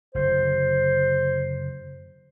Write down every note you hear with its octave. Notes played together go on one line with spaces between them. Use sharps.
F#1 D3 C5